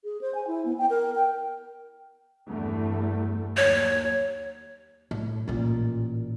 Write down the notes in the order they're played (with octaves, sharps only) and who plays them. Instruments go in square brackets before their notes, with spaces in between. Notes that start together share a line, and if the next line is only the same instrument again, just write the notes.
[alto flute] G#4
C5
G#5
E4
B3
G5
A#4
G5
[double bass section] E2 G2 A3
[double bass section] D#2 F#3 [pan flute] C#5
[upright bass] A2
A1 A#2